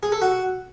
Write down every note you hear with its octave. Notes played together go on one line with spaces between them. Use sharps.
G#4
A4
F#4